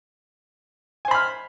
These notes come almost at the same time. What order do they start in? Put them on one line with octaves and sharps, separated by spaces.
G#5 C5 B5 F6